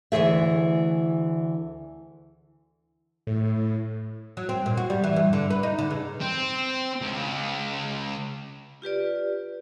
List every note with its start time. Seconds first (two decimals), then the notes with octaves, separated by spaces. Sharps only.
0.12 D2 G2 E3 G#4 E5
3.27 A2
4.37 F#3
4.49 C4
4.66 A#2
4.77 F#4
4.90 G3
5.04 E3
5.16 G2
5.33 D3
5.50 B4
5.63 D#4
5.79 D3
5.91 C#3
6.21 C4
7.02 C#2
8.82 F4 G4 B4 D5